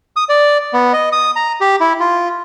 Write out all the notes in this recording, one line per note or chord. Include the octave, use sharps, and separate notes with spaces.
D#6
D5
B3
D#5
D#6
A#5
G4
E4
F4